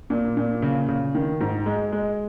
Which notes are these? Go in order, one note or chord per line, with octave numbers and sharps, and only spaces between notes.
A#2
A#2
C#3
C#3
D#3
G#2
G#3
G#3